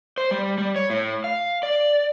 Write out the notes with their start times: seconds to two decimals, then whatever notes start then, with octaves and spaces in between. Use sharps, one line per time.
0.18 C5
0.31 G3
0.58 G3
0.76 C#5
0.90 A2
1.24 F5
1.63 D5